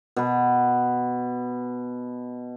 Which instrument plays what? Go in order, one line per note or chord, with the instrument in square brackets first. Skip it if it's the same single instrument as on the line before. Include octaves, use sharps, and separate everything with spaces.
[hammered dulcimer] B2 B4